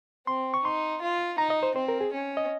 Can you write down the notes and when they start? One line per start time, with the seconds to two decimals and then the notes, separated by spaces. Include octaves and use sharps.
0.27 C4 C6
0.54 C#6
0.64 D#4 C6
1.02 F4
1.38 D#4 A#5
1.50 D#5
1.63 C5
1.75 C4 C5
1.88 A#4
2.01 G#4
2.13 C#4
2.37 D#5